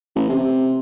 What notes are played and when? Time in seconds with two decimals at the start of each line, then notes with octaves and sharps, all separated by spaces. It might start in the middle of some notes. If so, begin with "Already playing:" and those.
0.15 A1
0.29 C3